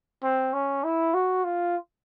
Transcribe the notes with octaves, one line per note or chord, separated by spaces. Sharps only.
C4
C#4
E4
F#4
F4